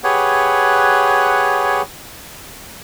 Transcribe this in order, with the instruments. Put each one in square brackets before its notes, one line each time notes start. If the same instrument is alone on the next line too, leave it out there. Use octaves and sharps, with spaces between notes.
[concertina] G4 G#4 B4 C#5 F#5